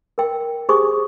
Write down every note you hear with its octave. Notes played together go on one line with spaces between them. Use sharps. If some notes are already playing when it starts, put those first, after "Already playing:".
A#4 G5
G4 G#4 C5 G#5 C#6 D#6